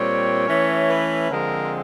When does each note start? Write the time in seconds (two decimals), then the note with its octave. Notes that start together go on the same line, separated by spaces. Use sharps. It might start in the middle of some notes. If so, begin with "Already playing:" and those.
Already playing: A#2 G3 C4 C#5
0.48 E3 A3 C#4
0.89 B4
1.30 D3 F3 G#3 C4 A#4